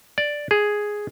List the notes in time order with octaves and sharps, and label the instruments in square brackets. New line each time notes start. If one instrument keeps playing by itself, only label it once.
[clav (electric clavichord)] D5
G#4